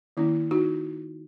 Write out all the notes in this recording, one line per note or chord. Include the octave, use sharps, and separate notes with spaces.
D#3 A#3 C#4 E4
D#4 F#4